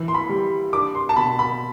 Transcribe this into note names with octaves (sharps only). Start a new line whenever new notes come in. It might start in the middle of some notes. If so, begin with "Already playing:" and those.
Already playing: E3
C6
B5
G3
D4 D6
C6
A5
B2 B5
B5